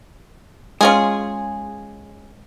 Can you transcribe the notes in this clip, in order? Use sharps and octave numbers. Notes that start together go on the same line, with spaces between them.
G#3 C#4 F4 G#4